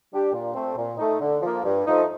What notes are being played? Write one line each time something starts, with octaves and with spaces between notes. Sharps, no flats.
G3 D4 G4
A#2
A3 C4
A#2
A3 D#4
D3
F3 A#3
G2
F3 A3 D#4